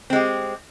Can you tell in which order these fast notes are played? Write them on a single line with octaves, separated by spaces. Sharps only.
C4 G#3 G4